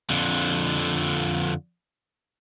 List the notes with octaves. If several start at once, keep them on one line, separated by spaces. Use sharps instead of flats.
F2 D3